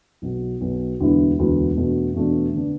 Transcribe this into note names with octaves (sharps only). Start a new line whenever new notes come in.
B1 B2 B3
B1 B2 B3
E1 D2 D3 B3 E4
E1 D2 D3 B3 E4
E2 B2 A3 D4
E2 B2 A3 D4
D3 B3 D4